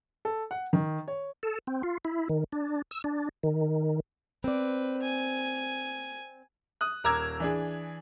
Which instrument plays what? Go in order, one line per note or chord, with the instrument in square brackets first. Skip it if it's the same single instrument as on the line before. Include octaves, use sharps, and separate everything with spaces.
[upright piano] A4
F#5
D#3
C#5
[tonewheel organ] A4
C4
F4
E4
D#3
D4
E6
D4
D#3
[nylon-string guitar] C4 D5 [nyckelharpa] B4
[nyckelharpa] G#5
[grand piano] D#6 F#6
D#1 A#4 A#5 D6 E6 G#6
E3 D4 G#4